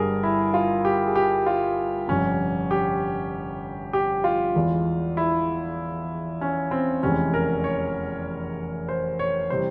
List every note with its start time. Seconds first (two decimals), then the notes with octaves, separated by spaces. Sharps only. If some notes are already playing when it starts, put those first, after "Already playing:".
Already playing: G1 G2 G3 G#4 A#4
0.23 E4
0.54 F4
0.85 G4
1.06 G#4
1.16 G4
1.46 F4
2.08 G1 F2 C3 C#4
2.71 G4
3.93 G4
4.24 F4
4.55 E2 E3 G#3
5.17 E4
6.41 C#4
6.71 C4
7.03 F1 E2 C3 E3 G#3 C#4
7.34 A#4
7.64 C#5
8.89 C5
9.19 C#5
9.50 C3 E3 G3 C5